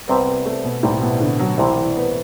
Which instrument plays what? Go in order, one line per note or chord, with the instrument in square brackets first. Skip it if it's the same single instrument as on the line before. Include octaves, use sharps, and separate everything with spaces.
[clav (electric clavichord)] C2 C3 G3 C4 [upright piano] B3
[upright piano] B3
A3
B2
[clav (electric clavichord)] C2 C3 G3 C4 [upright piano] A2
[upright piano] B2
D3
F#3
[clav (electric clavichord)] C2 C3 G3 C4 [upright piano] E3
[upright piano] E3
B3